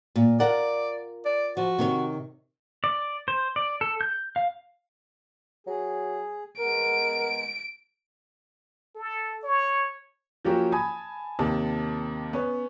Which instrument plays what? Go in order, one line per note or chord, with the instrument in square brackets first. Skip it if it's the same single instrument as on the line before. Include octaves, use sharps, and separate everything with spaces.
[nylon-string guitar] A#2
[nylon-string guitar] F4 A#4 F#5 [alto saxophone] D5
[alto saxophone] D5
[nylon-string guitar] F3 [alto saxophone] F#4
[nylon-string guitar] C3 D#3 C#5
[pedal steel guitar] D5
C5
D5
A4
G6
F5
[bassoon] F#3 [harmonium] G#4
[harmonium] G#3 B3 [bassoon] A#4 [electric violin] D7
[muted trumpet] A4
C#5
[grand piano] F3 F#3 A#3 C#4 G4
G#5 A5 B5 D#6 G#6
D#2 C3 A5
B3 C#4 C#5